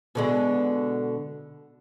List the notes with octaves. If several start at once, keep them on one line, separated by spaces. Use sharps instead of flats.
B2 D3 G#3